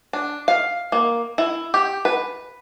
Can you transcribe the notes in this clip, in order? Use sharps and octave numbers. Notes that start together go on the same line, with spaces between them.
D4
F5
A#3
E4
G4
B4